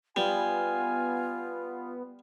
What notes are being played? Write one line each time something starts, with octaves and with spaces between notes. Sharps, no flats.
G3 B3 F4 G#5